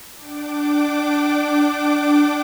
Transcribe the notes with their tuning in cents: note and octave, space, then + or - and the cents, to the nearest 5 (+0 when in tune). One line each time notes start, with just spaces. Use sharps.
D4 +0 G5 -35 D6 +0